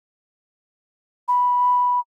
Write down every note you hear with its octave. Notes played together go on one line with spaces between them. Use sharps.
B5